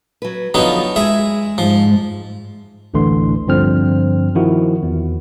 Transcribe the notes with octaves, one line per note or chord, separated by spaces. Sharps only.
F#3 B4
D3 F3 F#3 B3 D#4
G#3 G#4 E5
G#2 F3
A1 D2 A2 D3 E3 C6
G2 D3 F3 C4 F6
D#3 F3 E4 F#4
E2